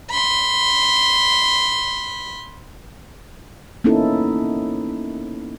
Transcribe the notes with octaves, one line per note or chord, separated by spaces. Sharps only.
B5 C6
A#3 B3 C#4 D#4 E4 A4